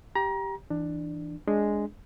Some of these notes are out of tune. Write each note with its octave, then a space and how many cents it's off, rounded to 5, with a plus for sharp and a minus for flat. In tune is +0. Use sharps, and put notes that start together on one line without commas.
G4 +0 A#5 +30
E3 +0 D4 +15
G#3 +0 D4 -10